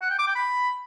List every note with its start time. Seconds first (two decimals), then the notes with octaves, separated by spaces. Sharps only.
0.02 F#5
0.10 G5
0.19 D6
0.27 G5
0.36 B5